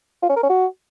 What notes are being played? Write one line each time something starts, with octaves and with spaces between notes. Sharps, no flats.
F4
C#4
A#4
C#4
F#4